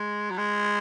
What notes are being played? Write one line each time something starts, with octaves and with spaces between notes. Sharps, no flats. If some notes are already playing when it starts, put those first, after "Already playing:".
Already playing: G#3
F#3
G#3